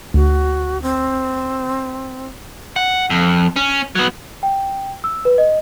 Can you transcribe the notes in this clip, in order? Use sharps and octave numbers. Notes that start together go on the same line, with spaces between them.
D2 F#4
C4
F#5
F2
C#4
F#3 B3
G5
E6
B4
D#5